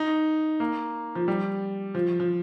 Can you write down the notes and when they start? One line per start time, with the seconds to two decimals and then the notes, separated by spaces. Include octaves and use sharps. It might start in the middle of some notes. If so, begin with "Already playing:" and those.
Already playing: D#4
0.60 A#3
1.15 F3
1.28 G3
1.95 F3
2.20 F3